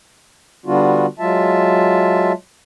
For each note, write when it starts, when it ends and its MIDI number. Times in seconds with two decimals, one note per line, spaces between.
0.66 1.06 50
0.66 1.06 55
0.66 1.06 59
0.66 1.06 62
0.66 1.06 65
0.66 1.06 66
1.19 2.32 54
1.19 2.32 56
1.19 2.32 65
1.19 2.32 76
1.19 2.32 81